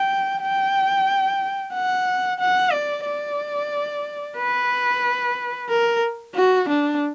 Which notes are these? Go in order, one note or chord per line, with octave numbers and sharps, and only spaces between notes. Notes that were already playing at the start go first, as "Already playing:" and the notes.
Already playing: G5
G5
F#5
F#5
D5
D5
B4
A#4
F#4
D4